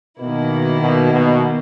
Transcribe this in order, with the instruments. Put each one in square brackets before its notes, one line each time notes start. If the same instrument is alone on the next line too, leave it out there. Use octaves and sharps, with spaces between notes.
[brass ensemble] B2 [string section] D#3 A#3 E4
[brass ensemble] B2
B2